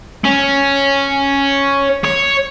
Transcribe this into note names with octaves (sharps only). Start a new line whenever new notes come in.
C#4
C#5